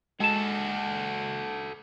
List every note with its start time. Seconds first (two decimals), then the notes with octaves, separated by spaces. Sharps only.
0.20 G#3 F#4 A4 A5